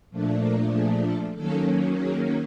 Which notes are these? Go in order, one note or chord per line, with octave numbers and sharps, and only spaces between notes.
A#2 F3 A3 D4
A#4
G#4
A4
D#3 F#3 A#3 C#4 A4
G#4